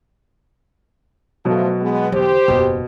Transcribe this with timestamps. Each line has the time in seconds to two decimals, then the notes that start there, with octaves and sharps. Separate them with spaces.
1.45 B2 F3 F#3 A3
1.79 G#3 B3
2.12 E2 D3 G4 C5
2.48 F#1 E2 B2